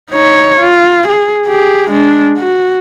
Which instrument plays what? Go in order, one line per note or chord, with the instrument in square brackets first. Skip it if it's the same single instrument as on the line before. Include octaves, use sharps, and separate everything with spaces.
[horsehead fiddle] D#4 C#5
F4
G#4
G4 G#4
G#3 D4
F#4